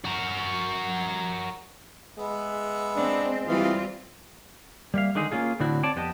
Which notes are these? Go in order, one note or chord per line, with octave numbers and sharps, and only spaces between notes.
F#4 A#4
G#3 B3 B4 E5
C4 D4
E3 G3 C4 F4 F5 D#6
G3 A#3 E5 F5
D3 D#3 G#3 D#4 G#4
A#3 C#4 F4 G#4
A2 D3 C4 D4 E4 F#4
C4 C#5 D5 A5
F2 B3 G4 D#5 A5